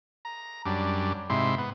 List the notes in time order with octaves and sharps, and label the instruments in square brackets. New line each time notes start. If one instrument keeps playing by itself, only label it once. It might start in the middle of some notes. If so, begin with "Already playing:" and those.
[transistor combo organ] A#5
F#2 G3 D4
G#2 C3 E4 C6
B3